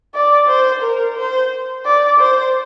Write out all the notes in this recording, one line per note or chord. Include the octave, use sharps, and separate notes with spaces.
D5
C5
A#4
C5
D5
C5